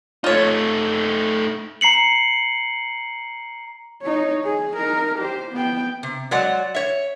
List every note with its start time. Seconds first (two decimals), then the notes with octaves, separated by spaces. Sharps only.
0.24 A3 D#4 F4 C#5
1.81 A#5 C7 C#7 F#7
4.02 D#4 C#5
4.44 G#4
4.77 D#4 A#4
5.19 G4 C5
5.52 B3 G5
6.03 C3
6.31 F#3 G#3 D5 F#5
6.75 C#5 E5